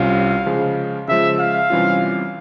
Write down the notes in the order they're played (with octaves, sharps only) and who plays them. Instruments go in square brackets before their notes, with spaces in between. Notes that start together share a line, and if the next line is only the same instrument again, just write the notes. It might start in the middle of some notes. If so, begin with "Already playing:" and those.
Already playing: [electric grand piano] C2 C3 G3 C#4 F4 [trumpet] F5
[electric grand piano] C#3 F3 G#3
[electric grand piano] C#3 F3 G#3 [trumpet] E5
[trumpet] F5
[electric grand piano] C3 E3 G3 C#4 F4